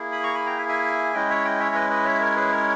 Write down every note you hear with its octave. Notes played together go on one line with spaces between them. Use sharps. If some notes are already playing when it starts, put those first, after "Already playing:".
Already playing: A#3 E4 G#4
B5 D#6
A#5 C#6
G#5 B5
G5 A#5
E5 G#5
E5 G#5
G#3 C#4 E4 D#5 G5
C#5 E5
D#5 G5
C#5 E5
B4 D#5
B4 D#5
C#5 E5
A#4 C#5
G#4 B4
A#4 C#5